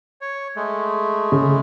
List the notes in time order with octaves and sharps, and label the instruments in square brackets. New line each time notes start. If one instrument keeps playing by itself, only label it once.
[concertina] C#5
G#3 A3
[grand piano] C#3